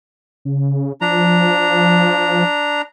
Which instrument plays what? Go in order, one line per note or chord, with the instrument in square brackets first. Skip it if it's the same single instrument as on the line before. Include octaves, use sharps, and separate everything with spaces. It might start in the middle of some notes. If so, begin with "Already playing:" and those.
[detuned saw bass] C#3
[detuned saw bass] F3 [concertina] D4 A#5